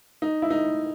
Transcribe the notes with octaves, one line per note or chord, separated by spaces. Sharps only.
D#4
E4
D#4